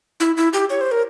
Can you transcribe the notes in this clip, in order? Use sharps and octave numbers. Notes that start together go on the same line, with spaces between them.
E4
E4
G4
C#5
C5
A#4